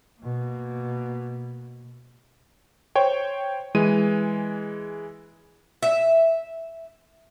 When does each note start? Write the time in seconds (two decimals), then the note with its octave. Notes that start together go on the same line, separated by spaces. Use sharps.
0.20 B2 A#3
2.95 C5 C#5 G5
3.75 E3 G#3 D#7
5.83 E5